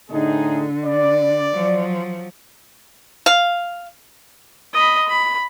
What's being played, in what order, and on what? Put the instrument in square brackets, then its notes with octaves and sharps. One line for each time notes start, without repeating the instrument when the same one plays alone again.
[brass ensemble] A2 D#4 G#4 [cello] D3
[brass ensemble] D5
[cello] F3 F#3
[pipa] F5
[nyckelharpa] D#5 B5
B5